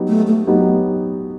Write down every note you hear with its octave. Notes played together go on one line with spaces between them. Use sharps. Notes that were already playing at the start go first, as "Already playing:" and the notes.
Already playing: F#3 B3 D#4 G4
A3
A3
F#3 B3 D#4 G4